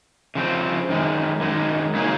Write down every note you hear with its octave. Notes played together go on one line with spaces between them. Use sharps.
C#3 F3 C4
F#2 D#3 G#3
F#2 D#3 G#3
C#3 F#3 A#3 D#4 G#4